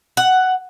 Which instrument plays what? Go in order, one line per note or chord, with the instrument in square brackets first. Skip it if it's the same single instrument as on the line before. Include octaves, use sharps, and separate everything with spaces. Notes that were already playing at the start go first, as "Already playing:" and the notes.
[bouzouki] F#5